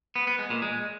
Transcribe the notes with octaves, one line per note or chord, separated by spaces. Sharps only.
B3
B3
G#3
A#2
G#3